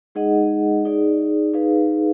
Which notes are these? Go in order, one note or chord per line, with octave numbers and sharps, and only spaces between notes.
G#3 D#4 G#4 D#5 F#5
D#4 G#4 D5
D#4 G#4 B4 F5